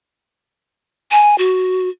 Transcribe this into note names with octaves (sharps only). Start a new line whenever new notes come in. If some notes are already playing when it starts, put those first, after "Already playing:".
G#5
F#4